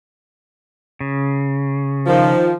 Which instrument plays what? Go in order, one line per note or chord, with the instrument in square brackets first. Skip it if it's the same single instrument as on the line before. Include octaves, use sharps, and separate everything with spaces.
[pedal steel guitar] C#3
[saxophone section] D#3 F3